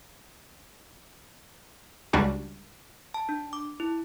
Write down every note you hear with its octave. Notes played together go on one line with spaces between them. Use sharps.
C#2 G3 D4 F#4
A5
D4
D6
E4